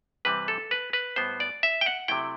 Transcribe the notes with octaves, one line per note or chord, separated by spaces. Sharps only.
C3 E3 G3 C4 E4 B4
A4
B4
B4
A2 G3 B3 C5
D5
E5
G5
F#5
C3 F#3 A3 E4 G5